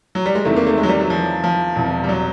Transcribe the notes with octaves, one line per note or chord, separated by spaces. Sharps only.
F#3
G3
G#3
E2 C3 D#3 A3
A#3
A3
G#3
F#3
G3
F#3
F3
F3
E1 E2 C3
G3
F#3